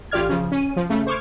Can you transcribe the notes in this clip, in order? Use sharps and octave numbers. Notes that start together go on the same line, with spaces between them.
A1 F4 G4 D5 F6 G#6
C#3 F3
C#4 D#7
F3
C#3 A3
C5 C#6 D6 F6 G#6